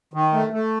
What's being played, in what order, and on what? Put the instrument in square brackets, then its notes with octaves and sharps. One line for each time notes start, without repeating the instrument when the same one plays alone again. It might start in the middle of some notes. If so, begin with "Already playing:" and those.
[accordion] D#3
A3
A3